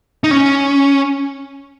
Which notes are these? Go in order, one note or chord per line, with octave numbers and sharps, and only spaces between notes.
D#4
C#4